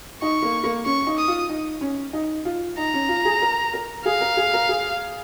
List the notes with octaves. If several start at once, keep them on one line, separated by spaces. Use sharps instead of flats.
D#4 C#6
A#3
A#3
C#4 C#6
D#4
D#6
F4
D#4
C#4
D#4
F4
D#4 A#5
C#4
F4
G#4
A#4
A#4
G#4 F5
A#4
G#4
A#4
G#4